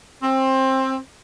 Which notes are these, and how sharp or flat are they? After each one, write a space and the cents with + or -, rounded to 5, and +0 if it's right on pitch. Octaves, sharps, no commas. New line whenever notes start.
C4 +20